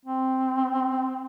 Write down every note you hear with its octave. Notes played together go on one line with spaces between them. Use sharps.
C4